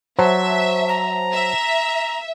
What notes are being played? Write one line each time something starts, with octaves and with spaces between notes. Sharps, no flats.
F#3 C5 E5 A5
A#5
E5